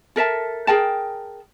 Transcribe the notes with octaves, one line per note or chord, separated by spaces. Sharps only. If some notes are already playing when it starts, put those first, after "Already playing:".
A4 A#4 E5 A5
G#4 A#4 G5 A5